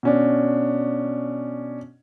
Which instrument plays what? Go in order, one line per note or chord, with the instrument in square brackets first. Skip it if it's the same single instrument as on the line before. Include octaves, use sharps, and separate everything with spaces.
[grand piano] B2 C#4 D4